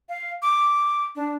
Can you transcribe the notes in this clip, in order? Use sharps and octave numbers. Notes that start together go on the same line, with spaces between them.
F5
D6
D4